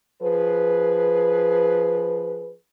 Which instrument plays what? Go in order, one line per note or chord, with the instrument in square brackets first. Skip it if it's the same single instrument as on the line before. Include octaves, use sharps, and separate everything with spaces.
[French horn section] F3 G#4 B4